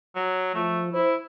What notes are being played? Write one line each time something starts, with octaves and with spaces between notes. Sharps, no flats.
F#3
F3 A3
E4 C5